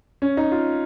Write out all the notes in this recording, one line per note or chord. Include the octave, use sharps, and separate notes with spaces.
C#4
D#4
F4